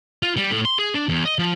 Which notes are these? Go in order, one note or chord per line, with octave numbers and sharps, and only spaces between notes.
F4
G3
A2
C6
G#4
D4
E2
D#5
F3